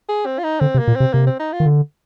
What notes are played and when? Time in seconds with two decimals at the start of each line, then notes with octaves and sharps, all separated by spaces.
0.09 G#4
0.26 C4
0.39 F4
0.44 D#4
0.61 D3 C4
0.75 C3
0.79 A#3
0.88 A#2
0.96 C3 C4
1.13 C3 A#3
1.27 C4
1.40 D#4
1.52 F4
1.60 D#3
1.66 D3